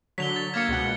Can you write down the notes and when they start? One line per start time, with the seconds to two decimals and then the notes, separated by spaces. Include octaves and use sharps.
0.18 D3 F#3 B6 F7 G7
0.36 A6
0.54 A#3 F5 E6 G#6 C#7
0.69 C#2 B2 F#5